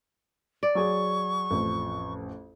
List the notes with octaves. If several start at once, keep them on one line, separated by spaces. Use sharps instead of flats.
D5
F#3 G#4 C#6
A1 F2